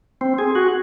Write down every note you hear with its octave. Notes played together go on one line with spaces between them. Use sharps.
C4
G#4
F#4